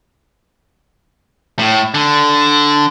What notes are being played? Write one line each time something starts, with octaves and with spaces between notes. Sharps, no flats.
A2
D3